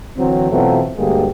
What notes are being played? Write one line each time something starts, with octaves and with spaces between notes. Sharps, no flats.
D3 E3 F#3 C4
B2 E3 F#3 A3 C4 F4
D2 G2 D3 G#3 A#3 G4